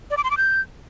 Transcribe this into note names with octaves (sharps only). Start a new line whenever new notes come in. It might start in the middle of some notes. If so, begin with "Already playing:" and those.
D5
D6
C6
D6
G6